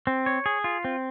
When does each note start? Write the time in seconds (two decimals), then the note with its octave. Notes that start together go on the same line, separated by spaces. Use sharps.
0.07 C4
0.26 C#5
0.46 G#4
0.64 F4
0.85 C4